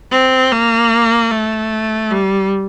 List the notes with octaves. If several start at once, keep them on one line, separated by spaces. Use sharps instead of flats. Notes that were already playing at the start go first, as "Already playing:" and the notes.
C4
A#3
A3
G3